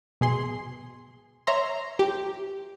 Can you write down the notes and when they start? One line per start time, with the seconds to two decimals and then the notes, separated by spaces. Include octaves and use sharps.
0.21 B2 G#4 C6
1.47 C#5 E5 A#5 C6
1.99 G4